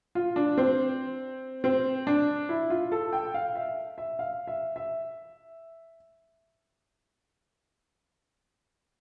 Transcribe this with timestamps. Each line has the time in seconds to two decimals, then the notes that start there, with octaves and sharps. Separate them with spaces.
0.15 F4
0.36 D4
0.58 C4
1.64 C4
2.07 D4
2.49 E4
2.70 F4
2.92 A4
3.13 G5
3.34 F5
3.56 E5
3.98 E5
4.19 F5
4.47 E5
4.76 E5